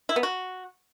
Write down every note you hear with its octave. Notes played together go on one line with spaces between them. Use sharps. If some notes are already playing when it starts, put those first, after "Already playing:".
E4
B3
F#4